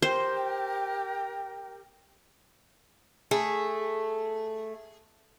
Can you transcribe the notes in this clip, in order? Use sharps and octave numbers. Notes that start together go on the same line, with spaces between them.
G4 A#4 C5 G5
A3 G#4